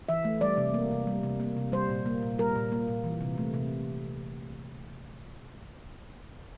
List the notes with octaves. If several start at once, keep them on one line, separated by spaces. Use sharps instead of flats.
E3 E5
A3
G3 D5
C3
A#3
C3
G3
C3
A#3
C3
G3 C5
A#2
A#3
A#2
G3 A#4
A#2
A#3
A#2
E3
C3
A3
C3